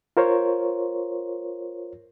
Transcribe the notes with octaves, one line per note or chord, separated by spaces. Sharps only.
F4 A#4 C5 C#5